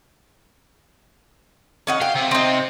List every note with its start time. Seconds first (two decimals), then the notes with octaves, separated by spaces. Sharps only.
1.87 C#4 D#4 F#5
2.01 F5 G5
2.16 C3
2.31 C4 D#4